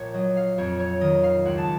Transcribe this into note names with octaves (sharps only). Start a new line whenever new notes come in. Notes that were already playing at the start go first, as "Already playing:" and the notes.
Already playing: A#1 C#5
F#3 D#5
F5
F2 C#5
C#5
D#3 D#5
F5
C#2 F#5
A5